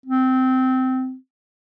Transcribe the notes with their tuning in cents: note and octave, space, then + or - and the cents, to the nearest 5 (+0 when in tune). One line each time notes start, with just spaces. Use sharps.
C4 -15